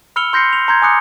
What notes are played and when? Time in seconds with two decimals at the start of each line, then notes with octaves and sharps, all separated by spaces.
0.16 B5 E6 F6 C#7 F7 G7
0.33 C6 G6 A#6 C7 C#7
0.53 F7
0.68 A#5 C6 G6 G#6
0.82 G#5 D6 D#6 F#6 C#7